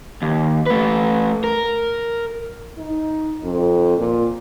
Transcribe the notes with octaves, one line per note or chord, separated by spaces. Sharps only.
D#2
A3 B4
A#4
D#4
F2
A#2